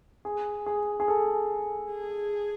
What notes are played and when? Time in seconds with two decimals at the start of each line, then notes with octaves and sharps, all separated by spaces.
0.25 G#4
0.66 G#4
1.00 G#4
1.08 A4
1.91 G#4